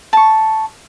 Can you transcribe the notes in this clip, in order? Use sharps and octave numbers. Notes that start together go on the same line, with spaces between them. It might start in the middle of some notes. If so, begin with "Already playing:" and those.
A5 C#6